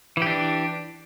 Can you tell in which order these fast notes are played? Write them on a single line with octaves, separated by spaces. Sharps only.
E3 G4 D4